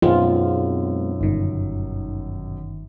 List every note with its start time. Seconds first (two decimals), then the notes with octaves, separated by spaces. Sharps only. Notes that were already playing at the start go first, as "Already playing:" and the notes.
0.02 B1 F#2 G#3 B3 C4 F4
1.21 G1 D#3